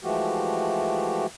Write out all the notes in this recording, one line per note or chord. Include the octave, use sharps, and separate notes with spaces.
E3 F3 G#3 A3 F#4 G4